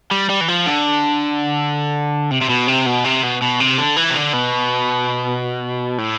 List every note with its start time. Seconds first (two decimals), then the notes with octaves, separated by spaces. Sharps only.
0.11 G3
0.29 G3
0.41 E3
0.49 F3
0.66 D3
2.31 C3
2.42 C3
2.50 B2
2.68 C3
2.86 B2
3.05 C3
3.23 B2
3.42 B2
3.60 C3
3.78 D3
3.97 E3
4.10 C3
4.16 D3
4.33 B2
5.98 A2